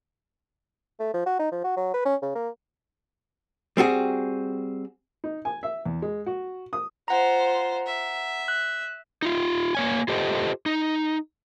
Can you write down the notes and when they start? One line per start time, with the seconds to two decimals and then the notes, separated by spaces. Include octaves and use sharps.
1.00 A3
1.14 F3
1.26 F#4
1.39 D#4
1.52 F3
1.64 F#4
1.77 F#3
1.94 B4
2.05 C#4
2.22 C#3
2.35 A#3
3.77 G3 C4 F#4 G#4
5.24 D#4
5.45 G#5
5.63 E5
5.86 E2
6.02 G#3
6.26 F#4
6.73 D#6
7.08 F4 C5 F#5 A#5
7.86 E5
8.48 F#6
9.22 D#4 F4
9.75 A#3 C#5 G#5
10.08 F4 G4 A4 C5 D#5
10.66 D#4